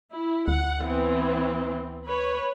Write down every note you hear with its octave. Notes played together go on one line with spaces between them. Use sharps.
E4
D2 F#5
E3 B3 C4
B4 C#5